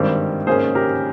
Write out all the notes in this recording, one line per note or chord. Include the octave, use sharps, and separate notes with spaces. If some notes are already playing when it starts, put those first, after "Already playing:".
Already playing: G#1 G2 D#3 G3 C4
G#1 G#2 D#3 A#3 C#4 G#4 C5
G4 A#4